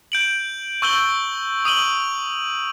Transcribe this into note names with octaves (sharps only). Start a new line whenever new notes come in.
G6 D7 F#7
C#6 E6 G6 F#7 G7
D#6 D#7 F#7 G7